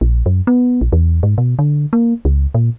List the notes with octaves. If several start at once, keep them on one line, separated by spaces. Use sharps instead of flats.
A#1
F#2
B3
A#1
E2
G#2
B2
D3
A#3
C#2
A#2